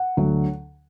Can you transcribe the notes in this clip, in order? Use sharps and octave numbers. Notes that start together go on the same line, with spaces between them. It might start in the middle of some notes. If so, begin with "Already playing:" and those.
Already playing: F#5
D2 D3 F#3